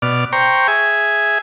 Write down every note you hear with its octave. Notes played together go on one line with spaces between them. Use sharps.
B2 D5 F6
C5 G5 A#5 C#6
G#4 E5 G#5